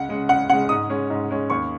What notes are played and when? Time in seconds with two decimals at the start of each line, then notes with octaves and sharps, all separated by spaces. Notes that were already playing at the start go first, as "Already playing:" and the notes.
Already playing: C#2 F#5
0.09 C#3 G#3
0.29 C#2 F#5
0.49 C#3 G#3 F#5
0.69 G#2 D#6
0.89 G#3 C#4
1.10 G#2
1.30 G#3 C#4
1.50 D#2 C#6